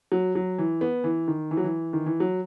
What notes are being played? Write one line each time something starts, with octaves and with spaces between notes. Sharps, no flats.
F#3
F#3
E3
B3
E3
D#3
E3
F#3
E3
D#3
E3
F#3